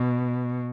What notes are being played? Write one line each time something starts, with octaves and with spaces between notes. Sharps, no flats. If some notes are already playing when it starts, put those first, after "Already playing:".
Already playing: B2